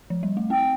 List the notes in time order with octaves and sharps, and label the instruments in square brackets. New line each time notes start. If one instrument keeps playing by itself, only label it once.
[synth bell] F3
G3
A3
[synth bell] C4 [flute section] G5